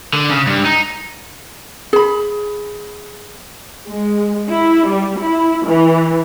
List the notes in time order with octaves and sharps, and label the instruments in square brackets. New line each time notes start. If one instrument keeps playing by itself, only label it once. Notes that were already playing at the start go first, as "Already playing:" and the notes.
[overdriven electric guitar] D3
C#3
G2
D#4
[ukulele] G#4 B5
[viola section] G#3
E4
G3
E4
E3